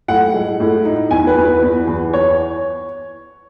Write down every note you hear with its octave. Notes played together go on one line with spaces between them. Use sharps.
A2 F#5
G#3
A2
D#4
E2 G#5
B4
E2
B4
E2
E2
C#5